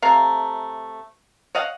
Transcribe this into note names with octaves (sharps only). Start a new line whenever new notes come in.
C3 A3 F5 A#5
C#5 D#5 F5 F#5